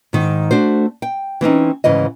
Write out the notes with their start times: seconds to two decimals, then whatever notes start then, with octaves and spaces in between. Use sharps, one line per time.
0.13 G#2 D#3
0.51 A3 D4 F#4 C5
1.02 G5
1.41 E3 C4 C#4 D#4
1.84 D2 G#2 C#3 E3 D#5